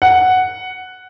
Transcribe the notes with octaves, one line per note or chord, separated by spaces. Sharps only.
F#5